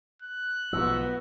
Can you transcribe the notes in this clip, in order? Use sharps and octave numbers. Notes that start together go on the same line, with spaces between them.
F#6
B1 G#2 F3 B3 F#4 E6